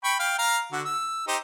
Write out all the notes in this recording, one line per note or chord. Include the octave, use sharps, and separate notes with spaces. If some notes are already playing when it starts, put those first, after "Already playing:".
G5 B5 C#6
F5 G5
F5 A#5
D3 F#4
E6
D#4 G4 C5